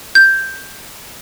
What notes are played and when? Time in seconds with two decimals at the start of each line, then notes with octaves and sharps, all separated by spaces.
0.15 G6